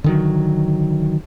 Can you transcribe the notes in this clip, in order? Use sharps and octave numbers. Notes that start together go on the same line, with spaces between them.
D3 D#3 F#3